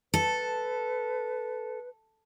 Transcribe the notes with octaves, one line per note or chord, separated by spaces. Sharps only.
A4 B4